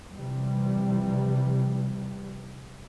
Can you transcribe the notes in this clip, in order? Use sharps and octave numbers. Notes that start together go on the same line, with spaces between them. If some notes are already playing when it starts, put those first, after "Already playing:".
C3 E3 F3 G3